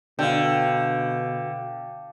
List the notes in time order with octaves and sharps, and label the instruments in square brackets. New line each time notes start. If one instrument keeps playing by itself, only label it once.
[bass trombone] B2 [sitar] D3 [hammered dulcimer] F5 G5